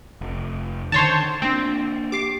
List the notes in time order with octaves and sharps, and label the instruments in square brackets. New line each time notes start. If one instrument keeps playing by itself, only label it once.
[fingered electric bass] F1
[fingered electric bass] D3 D#3 [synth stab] C5 C#5 A5 [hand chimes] A6
[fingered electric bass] A#3 D4 [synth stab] C4
[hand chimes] G4 C7 [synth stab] D6